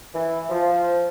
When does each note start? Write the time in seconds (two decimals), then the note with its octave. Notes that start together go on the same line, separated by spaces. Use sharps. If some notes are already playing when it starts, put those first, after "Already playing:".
0.14 E3
0.49 F3